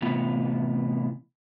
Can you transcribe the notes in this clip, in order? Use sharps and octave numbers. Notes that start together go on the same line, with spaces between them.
A2 C3 E3 B3 F4